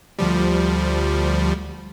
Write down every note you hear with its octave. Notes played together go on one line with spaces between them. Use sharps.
D2 F3 G3